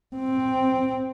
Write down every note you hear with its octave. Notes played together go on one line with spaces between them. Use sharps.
C4